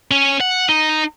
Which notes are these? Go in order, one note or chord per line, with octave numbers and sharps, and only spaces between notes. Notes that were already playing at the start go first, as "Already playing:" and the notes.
C#4
F#5
D#4